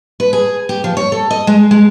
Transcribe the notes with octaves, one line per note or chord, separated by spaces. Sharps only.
B4
G#4
G4
F3
C#5
A4
D#5
G#3
G#3